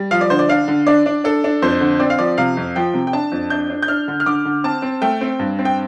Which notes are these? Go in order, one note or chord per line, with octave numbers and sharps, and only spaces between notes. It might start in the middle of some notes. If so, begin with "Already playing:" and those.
Already playing: G3
F3 F5
D5
D3 C5
D5
D4 F5
D3
D4 D5
D4
D4 A4
D4
F2 C5
D3
C4 D5
F5
F3 D5
C3 F5
F2
F3 G5
C3
G5
D4 A5
F2
D4 G6
D4
G6
D4 F6
D3
F6
D3 D6
D3
C4 A5
C4
A3 G5
C4
G2
C4
G5